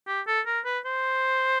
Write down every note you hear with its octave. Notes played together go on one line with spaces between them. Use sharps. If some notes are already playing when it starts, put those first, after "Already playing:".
G4
A4
A#4
B4
C5